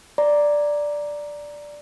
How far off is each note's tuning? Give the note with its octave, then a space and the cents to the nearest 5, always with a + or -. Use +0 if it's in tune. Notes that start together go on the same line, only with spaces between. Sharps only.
D5 +0 A#5 +0